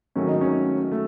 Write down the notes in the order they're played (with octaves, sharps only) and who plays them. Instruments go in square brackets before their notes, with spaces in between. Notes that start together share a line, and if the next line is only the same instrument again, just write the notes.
[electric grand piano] G#2 D#3 F#3 A3 [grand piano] C#4
[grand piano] D#4
C#4
A3